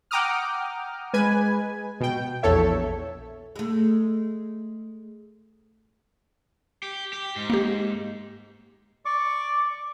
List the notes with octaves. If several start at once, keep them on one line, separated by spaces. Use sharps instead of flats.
F#5 G5 A#5 D6 D#6 F6
G#3 B4 G#5
B2 G5
A#1 E2 A4 C#5 E5
G#3 A3
G4
G4
G#2
A#3 G4
D5 C#6 D6